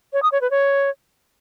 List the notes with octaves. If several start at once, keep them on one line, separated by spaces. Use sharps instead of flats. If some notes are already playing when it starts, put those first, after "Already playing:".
C#5
D#6
C#5
B4
C#5